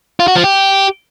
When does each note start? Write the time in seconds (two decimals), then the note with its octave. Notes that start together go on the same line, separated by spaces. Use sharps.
0.20 F4
0.28 F#4
0.36 F3
0.44 G4